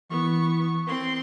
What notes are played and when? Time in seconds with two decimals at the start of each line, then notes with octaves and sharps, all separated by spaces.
0.11 E3 B3 C#6
0.87 C4 C6